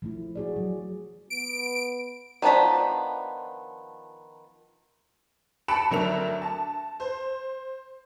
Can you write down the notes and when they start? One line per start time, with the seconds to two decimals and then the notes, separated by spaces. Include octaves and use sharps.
0.02 F3 A3 E4
0.35 F#4 G#4 D5
0.56 F#3
1.30 B3 D7
2.42 D#3 F3 B3 D4 B5
5.68 A5 B5 F#6 C#7 D7 E7
5.90 D2 F#3 D4 A#4 E5 F7
6.42 A5
7.00 C5